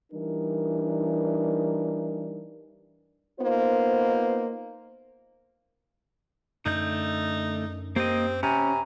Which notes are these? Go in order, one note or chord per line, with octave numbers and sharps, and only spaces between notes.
E3 G3 D4 D#4 A#4
A#3 B3 D#4 F4 C5
F#2 D3 A3 D#4 G6
A#3 C4 G4 D#5
C3 C#4 G#5 A#5 B5